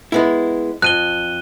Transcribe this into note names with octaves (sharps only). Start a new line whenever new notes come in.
G#3 B3 E4
F2 F#6 D#7 G7